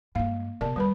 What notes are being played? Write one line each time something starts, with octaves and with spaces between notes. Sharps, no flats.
G2 G#3 A#3 F5
C3 B3 A#4 D5 A5
D2 D#3 G3 B4 B5